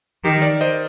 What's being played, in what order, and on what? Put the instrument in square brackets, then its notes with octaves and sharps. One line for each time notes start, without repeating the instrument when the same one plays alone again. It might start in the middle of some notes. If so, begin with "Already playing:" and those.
[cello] D#3 [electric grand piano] G4
[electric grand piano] A#4 D5
C5 D#5